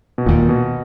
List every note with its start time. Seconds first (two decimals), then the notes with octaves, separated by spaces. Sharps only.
0.18 B2
0.26 E1 D#2 A#2 D#3
0.49 B2